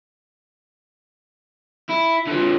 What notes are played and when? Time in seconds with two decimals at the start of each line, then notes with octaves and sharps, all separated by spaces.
1.89 E4
2.27 D3 F3